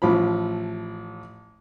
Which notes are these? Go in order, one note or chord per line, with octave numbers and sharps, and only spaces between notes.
A1 F3 B5